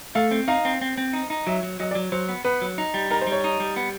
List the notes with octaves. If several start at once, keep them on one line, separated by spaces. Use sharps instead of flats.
A3 F5
C4
D#4 F5
C4
C4
C4
D#4
D#4
F#3 E5
F#3
F#3 D#5
D5
F#3
F#3 C5
B3
B3 B4
F#3
D#4
G3
D#4 A#4
C5
G3
C#5
D#4
G3
B3